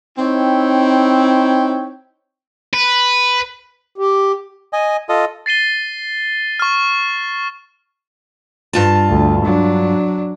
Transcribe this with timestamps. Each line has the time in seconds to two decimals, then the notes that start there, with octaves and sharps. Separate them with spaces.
0.18 C4 D#4 E4 C#5 G5
2.74 B4
3.98 G4
4.73 D#5 G#5
5.09 F4 A4 D#5
5.46 A6 C7 D#7 G7
6.60 C#6 F6
8.73 G2 F4 A5
9.09 D2
9.45 F#3 D4